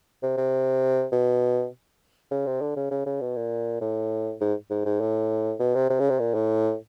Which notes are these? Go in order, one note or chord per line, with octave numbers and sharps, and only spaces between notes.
C3
C3
B2
C#3
C3
D3
C#3
C#3
C#3
B2
A#2
A2
G#2
G#2
G#2
A2
B2
C3
C3
C#3
C3
A#2
A2